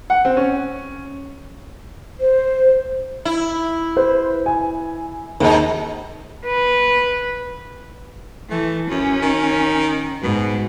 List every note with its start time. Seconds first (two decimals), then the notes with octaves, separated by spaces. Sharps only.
0.10 F#5
0.25 C4
0.37 C#4
2.20 C5
3.25 E4
3.96 B4 C5
4.46 G#5
5.40 D#2 G#2 D#4
6.46 B4
8.50 E3 A3
8.90 F#2 C#4
9.22 D#3
10.23 G#2 B2